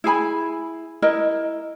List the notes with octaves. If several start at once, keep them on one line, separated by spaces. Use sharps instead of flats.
E4 G#4 G#5 B5
E4 A#4 D#5